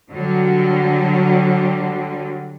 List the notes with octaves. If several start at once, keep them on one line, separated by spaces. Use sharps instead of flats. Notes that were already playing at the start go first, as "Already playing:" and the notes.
D3 F#3 G3